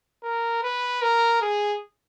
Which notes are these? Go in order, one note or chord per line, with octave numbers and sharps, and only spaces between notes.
A#4
B4
A#4
G#4